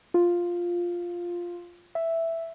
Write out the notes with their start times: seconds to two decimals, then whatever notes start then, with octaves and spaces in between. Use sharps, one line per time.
0.14 F4
1.95 E5